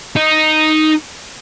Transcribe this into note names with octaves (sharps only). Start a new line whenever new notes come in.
D#4